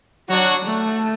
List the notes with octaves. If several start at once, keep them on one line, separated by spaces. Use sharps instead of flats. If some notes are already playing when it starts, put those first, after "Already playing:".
F#3 D4 F#4 C#5 F#5
A3